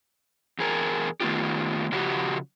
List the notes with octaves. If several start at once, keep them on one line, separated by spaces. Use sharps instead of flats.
E2 G#4 A#4
D#3 A3 B3 F4 G4
C#3 F3 F#4 G4